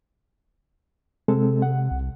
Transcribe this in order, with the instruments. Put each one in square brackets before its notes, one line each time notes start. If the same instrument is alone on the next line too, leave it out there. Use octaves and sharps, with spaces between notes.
[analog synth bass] C3 [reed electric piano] G#3 C4 A4
[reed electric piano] F#5
[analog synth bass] C2